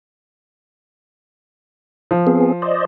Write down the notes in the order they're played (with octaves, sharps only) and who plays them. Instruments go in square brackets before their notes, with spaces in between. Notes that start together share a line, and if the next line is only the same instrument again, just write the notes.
[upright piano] F3
[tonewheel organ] B3 C4 G#4
C5 D5 D#5